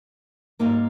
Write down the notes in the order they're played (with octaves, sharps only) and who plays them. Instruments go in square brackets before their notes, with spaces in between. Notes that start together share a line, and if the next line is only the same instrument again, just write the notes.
[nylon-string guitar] G#2 G3 A#3 D#4 A#4